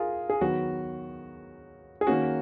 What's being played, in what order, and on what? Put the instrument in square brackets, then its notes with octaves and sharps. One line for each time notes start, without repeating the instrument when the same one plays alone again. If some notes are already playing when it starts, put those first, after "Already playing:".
Already playing: [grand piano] F4 G#4 A#4
G#4
D#3 F#3 B3 F#4
G#4
D#3 A#3 C#4 F#4